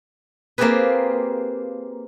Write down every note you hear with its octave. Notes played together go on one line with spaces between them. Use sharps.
A#3 C4 F4 G4 G#4 B4